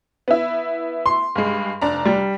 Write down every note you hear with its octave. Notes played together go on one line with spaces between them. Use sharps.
B3 E4
C6
G2 G#3
F1 D4 A#5
G3